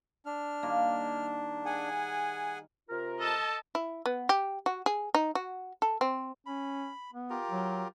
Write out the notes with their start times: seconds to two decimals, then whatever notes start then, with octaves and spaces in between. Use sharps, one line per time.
0.26 D4 F6
0.63 D#3 G3 A#3
1.65 G#4 F#5 G#5
2.89 C3 F4 A#4
3.20 A4 D#5 A5
3.75 E4
4.06 B3
4.29 G4
4.66 F#4
4.86 G#4
5.15 D#4
5.35 F#4
5.82 A4
6.01 C4
6.46 C#4 B5
7.13 B3
7.30 F4 G4 A#4
7.51 F#3